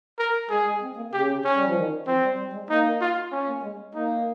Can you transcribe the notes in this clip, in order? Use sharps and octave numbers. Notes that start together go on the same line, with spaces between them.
A#4
G#3 G#4
G#3
C4
A#3
C#3 G4
C#4
G3
F3
D#3
F3 C4
G3
G3
G#3
A#3 D#4
F4
C#4
A#3
G#3
A#3 D#4